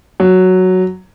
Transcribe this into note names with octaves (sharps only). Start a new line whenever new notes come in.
F#3